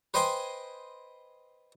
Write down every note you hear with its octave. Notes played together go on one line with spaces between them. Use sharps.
B4 C5 D#5 G5 G#5 C6